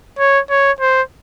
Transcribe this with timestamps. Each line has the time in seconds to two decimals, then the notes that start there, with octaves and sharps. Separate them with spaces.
0.19 C#5
0.50 C#5
0.80 C5